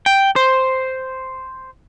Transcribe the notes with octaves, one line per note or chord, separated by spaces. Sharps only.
G5
C5